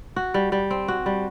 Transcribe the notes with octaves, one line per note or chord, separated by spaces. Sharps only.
F#4
G3
G3
C4
F#4
G3